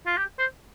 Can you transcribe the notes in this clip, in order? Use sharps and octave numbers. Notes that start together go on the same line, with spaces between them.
F4
G4
C5